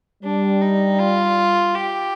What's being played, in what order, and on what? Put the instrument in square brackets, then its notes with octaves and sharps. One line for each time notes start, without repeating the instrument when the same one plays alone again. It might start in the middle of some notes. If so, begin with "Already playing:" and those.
[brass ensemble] G3 [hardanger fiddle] D4
[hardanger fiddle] D#4
F4
G4